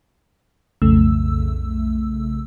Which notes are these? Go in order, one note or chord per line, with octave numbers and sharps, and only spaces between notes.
B1 F2 C#3 A3 E6